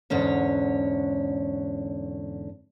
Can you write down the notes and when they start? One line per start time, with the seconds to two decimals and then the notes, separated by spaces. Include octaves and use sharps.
0.10 E2 G#2 D3 C#4 C#5